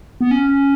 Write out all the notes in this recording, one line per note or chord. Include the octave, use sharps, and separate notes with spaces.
B3
C#4